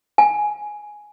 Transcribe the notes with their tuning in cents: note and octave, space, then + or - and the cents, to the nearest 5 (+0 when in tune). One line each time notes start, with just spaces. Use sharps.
G#5 +5